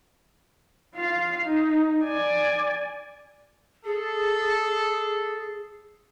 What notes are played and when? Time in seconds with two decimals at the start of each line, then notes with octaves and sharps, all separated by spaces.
0.95 F4 F5
1.44 D#4
2.04 D5 G#5
3.85 G#4 A4